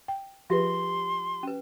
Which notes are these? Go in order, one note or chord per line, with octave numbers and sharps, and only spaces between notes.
G5
F3 F4 G4 G#4 B4 E5 C6
C#4 B4